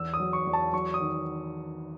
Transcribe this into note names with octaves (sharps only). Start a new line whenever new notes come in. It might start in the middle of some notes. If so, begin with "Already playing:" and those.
Already playing: E2 E6
D#6
F#3
C#6
E2
A5
F#3 C#6
D#6
D#3